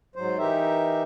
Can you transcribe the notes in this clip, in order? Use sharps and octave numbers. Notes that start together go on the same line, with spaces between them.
G#2 F#3 C5
E3 D#4 G4 A#4 E5